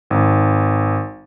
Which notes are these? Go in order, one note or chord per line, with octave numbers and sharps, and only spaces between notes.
G#1